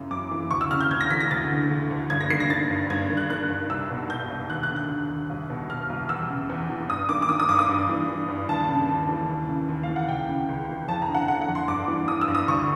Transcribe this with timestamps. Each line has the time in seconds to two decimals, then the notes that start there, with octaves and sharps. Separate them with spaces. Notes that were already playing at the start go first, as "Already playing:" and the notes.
Already playing: F#2 C#3 E3
0.11 F#2 D6
0.31 E3
0.51 D2 C#6
0.61 E6
0.71 C#3 F6
0.81 G6
0.91 D2 G#6
1.01 A#6
1.10 E3 B6
1.20 A#6
1.31 D2 A6
1.51 D3
1.70 D3
1.91 D2
2.10 G2 G#6
2.21 A#6
2.30 D#3 C7
2.40 A#6
2.50 D#3 A6
2.70 G2
2.90 G2 G#6
3.10 D#3
3.17 F#6
3.30 D#3 F#6
3.50 G2
3.69 C2 E6
3.90 B2
4.10 B2 G6
4.30 C2
4.50 D#2 F#6
4.63 F#6
4.70 D3
4.76 F#6
4.89 D3
5.09 D#2
5.30 C2
5.50 B2
5.69 B2 F6
5.90 C2
6.09 E2 E6
6.30 C#3
6.50 E2
6.70 E3
6.89 G2 D#6
7.09 D#3 D6
7.22 D6
7.29 D#3 D#6
7.40 D#6
7.49 G2 D6
7.59 D#6
7.69 G2
7.89 E3
8.09 E3
8.29 G2
8.49 D#2 A5
8.69 C#3
8.89 D#2
9.09 E3
9.29 D#2
9.49 C#3
9.69 D#2
9.83 F5
9.89 E3
9.96 F#5
10.08 C#2 G5
10.29 C#3
10.49 C#2
10.69 E3
10.88 F2 A5
11.02 A#5
11.08 D3
11.14 F#5
11.28 D3 F#5
11.42 F#5
11.48 F2
11.55 C6
11.68 G2 D6
11.88 E3
12.08 E3 D#6
12.21 E6
12.28 G2
12.35 D#6
12.48 D2 C#6